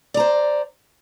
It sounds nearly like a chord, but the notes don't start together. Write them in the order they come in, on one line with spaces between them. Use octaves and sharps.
D5 A#5 C5